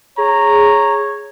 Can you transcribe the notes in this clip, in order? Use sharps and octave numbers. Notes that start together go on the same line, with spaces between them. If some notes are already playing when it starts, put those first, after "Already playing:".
G#4 C#5 A#5